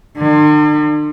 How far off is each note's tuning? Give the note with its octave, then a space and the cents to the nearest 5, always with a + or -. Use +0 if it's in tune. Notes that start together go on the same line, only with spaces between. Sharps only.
D3 +45